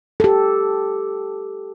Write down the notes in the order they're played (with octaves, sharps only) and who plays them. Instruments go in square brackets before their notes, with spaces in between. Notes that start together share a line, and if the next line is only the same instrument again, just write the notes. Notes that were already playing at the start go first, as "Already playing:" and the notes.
[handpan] G4 A4